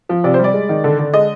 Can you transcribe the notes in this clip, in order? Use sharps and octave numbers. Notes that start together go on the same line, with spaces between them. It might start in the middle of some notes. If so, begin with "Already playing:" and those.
F3
C3 D5
C5
G3 D5
G#3
D#3
D3
D3
G#3 D#5